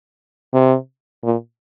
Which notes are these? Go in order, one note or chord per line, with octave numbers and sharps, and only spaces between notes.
C3
A#2